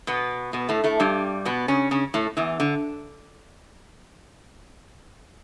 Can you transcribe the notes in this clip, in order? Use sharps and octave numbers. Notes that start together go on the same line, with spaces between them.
B2 B3
B2 B3
A2 A3
A2 A3
G2 G3
B2 B3
C#3 C#4
C#3 C#4
A2 A3
E2 E3
D3